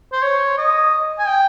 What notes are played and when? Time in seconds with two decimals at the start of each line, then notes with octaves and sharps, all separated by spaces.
0.13 C5
0.23 C#5
0.58 D#5
1.19 G#5
1.27 G5